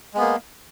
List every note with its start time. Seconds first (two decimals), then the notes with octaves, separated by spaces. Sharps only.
0.14 G#3
0.17 B3
0.20 A#3